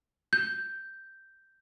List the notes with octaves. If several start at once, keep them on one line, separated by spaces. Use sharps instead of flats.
G6